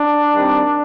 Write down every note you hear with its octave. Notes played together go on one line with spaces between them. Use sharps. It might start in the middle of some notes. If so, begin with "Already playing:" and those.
Already playing: D4
D#3 G3 C4